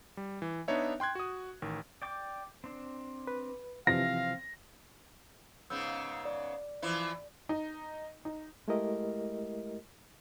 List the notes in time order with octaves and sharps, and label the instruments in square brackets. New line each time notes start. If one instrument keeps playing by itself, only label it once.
[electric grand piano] G3
E3
B3 D4 D#4 C#5 E5
G5 C6 F#6 G#6
F#4 D#6
A1 D#3
[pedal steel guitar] D5 G5 D6
C4 D4
[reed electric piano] B4
[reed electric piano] C3 E3 F3 [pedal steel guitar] C4 [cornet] F5 [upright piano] A#6
[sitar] G#2 C#3 B3 [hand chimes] E6 G6
[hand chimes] D5
[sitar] E3 F3 E4
[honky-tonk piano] D#4
D#4
[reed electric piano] G#3 A3 E4 G4 A#4 D#5